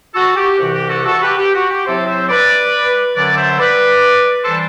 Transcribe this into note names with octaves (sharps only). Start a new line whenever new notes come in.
F#4 A4
G4
C2 C3 E3 F#4
G4
F#4 A4
F#4 A4
G4 B4
G4
F#4
G4
C3 F#3 C4 E4 A4 C5
C5 E5
B4 D5
F#2 D3 F#3 B4 D5
C5 E5
B4 D5
E3 G3 D4 A4 C5